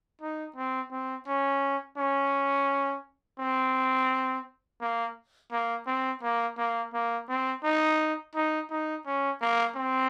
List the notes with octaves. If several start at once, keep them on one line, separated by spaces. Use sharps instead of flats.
D#4
C4
C4
C#4
C#4
C4
A#3
A#3
C4
A#3
A#3
A#3
C4
D#4
D#4
D#4
C#4
A#3
C4